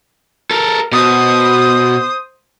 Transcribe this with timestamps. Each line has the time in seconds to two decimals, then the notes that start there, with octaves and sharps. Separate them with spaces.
0.51 A4 A#4
0.92 B2 C5 D#6